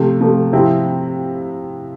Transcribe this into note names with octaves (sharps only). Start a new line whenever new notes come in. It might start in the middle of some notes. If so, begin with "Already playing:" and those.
Already playing: C3 F3 A3
C3 F3 A3
C3 F3 C4 E4